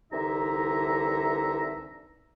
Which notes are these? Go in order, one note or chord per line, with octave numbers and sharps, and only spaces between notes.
C2 D3 E3 D#4 E5 A#5